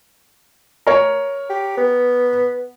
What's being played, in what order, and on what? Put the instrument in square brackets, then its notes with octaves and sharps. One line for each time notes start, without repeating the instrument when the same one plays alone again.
[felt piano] A#4 C#5
[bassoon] G4
B3